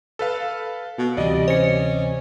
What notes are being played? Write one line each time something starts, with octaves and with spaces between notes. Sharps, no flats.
A4 B4 F5
B2
D2 C3 E3 G3 D5 D#5
C#4 C5 C#7